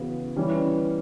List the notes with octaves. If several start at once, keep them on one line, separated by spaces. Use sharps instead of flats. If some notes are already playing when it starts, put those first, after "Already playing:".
Already playing: C#3 E3 B3 F#4
E3 G3 C#4